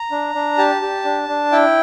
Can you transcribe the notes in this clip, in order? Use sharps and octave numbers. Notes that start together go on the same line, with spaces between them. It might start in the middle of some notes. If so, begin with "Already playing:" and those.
Already playing: A#5
D4
D4
G4 A5
G4
D4
D4
E4 G5